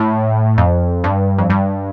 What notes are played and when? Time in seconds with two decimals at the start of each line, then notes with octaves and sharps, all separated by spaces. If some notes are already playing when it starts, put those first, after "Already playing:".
Already playing: A2
0.58 F2
1.04 G2
1.38 F2
1.50 G2